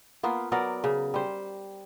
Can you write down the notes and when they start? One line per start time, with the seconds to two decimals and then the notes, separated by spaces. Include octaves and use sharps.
0.23 A#3 B3 F4
0.52 F#3 B3 A#4 D5
0.84 C#3
1.14 G3 C5